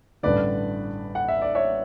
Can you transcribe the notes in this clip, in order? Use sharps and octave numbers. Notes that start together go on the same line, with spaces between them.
A1 G2 D3 B4 D5
F#5
E5
D5
C#5 E5